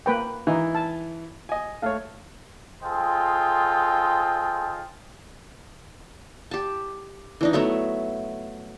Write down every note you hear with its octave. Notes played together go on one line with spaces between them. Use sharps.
A#3 B4 G5
E3 D#4
A5
D#5 G#5
A3 C#5 F5
F4 G#4 A4 C5 D#5 G5
G4 A5
E3 D4 D#4
F#3 A3 B3 E5